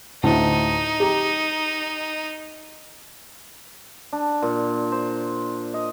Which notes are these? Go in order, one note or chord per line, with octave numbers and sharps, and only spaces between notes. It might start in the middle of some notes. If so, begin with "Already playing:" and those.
D2 A2 D#4 A5
G4 A#5
D4
A#2
C5
D#5